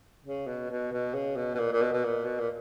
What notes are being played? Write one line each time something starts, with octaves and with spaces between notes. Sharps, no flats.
C#3
B2
B2
B2
C#3
B2
B2
A#2
A#2
B2
B2
A#2
B2
A#2